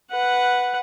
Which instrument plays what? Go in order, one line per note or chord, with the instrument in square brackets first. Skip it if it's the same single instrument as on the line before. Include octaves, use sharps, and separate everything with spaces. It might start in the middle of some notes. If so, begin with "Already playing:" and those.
[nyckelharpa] B4 F#5